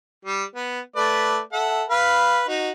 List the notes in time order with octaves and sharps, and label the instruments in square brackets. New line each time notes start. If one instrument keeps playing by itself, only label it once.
[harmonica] G3
B3
A3 B4 D5
A4 E5 F#5
B4 F5 B5
D#4 F#4